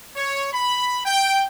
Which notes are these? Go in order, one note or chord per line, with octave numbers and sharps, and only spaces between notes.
C#5
B5
G5